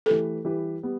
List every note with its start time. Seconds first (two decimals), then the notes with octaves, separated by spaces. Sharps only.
0.06 E3 A3 G4 A4 B4
0.45 E3 G3 E4 G4 B4
0.83 G3 B3